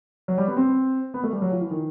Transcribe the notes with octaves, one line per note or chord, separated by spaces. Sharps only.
F#3
G3
B3
C4
B3
A3
G3
F#3
F3
E3
D#3